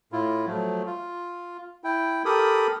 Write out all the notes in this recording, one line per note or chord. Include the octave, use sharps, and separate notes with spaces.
A2 E4 F4
F3 F#3 A3
F4
E4 G5
G4 A4 A#4 B5 D#6